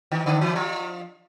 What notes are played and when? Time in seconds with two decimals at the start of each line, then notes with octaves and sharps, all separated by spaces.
0.12 D#3 D#4
0.26 D3 D4
0.41 E3 E4
0.55 F3 F4